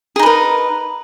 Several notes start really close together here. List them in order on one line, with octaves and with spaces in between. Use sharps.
G#4 D#4 B4 A#4